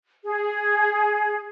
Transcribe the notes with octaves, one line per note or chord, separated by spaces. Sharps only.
G#4